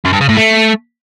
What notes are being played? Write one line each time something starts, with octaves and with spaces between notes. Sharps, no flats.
F#2
G2
C#3
A2
A3